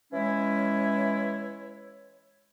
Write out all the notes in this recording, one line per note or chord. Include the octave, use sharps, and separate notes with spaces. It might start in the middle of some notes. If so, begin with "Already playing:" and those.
E3 G#3 C#4 E4 C#5